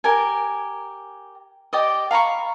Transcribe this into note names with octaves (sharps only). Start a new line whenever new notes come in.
G4 A#4 G#5
G4 D5 D#5
F5 A#5 B5 C#6